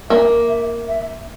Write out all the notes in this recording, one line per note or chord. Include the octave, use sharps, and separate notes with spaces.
A#3 E5
E5
E5